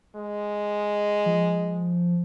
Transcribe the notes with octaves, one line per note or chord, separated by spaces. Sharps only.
G#3
F3